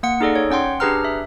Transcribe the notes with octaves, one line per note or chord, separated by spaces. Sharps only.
A#3 F#5 C#7
D#4 G#4 A4 D5
C#5
C#4 F#5 G5 C6
D4 G4 G#4 B4 A#5 F6
E5